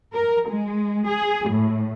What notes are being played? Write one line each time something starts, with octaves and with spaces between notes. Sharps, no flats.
A#4
G#3
G#4
A2